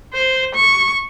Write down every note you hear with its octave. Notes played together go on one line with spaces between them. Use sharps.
C5
C#6